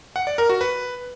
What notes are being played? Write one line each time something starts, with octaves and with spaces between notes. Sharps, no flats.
F#5
D5
A#4
F#4
B4